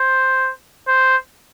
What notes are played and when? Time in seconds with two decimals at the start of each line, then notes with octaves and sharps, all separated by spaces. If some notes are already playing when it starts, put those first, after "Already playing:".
Already playing: C5
0.88 C5